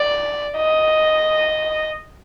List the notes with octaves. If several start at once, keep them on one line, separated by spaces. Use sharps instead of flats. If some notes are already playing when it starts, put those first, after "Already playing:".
Already playing: D5
D#5